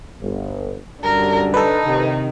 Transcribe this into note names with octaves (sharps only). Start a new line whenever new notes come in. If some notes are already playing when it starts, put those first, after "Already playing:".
G1
F#2 D3 G3 A#4
D#4 A4 B4
C3 D#3